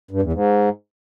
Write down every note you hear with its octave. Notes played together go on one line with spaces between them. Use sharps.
G2
E2
G#2